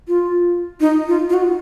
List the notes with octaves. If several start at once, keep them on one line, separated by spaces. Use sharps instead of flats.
F4
D#4
F4
F4
F#4